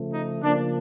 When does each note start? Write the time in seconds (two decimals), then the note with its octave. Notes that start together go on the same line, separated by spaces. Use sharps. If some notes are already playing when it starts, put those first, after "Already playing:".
Already playing: C#3 F3 A3
0.12 D#4
0.42 C#3 F3 A#3 D4